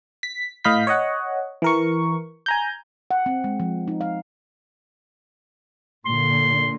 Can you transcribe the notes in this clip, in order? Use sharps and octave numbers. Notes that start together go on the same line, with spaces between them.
B6
A2 D#5 F5 B5 G6 B6
C#5 D#5 F#5
E3 A#4 C#6
G#5 A#5 G6
F#5
C4
G#3
F3
D#4
F5
A#2 D3 C6